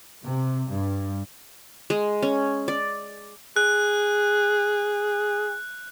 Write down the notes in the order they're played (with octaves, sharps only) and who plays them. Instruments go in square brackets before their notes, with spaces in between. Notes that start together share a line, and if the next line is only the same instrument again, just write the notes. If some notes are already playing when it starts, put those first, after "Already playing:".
[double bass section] C3
G2
[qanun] G#3
C#4
D5
[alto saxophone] G#4 [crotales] F#6